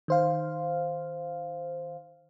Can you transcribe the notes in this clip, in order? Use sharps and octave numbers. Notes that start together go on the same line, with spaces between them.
D#3 C5 F5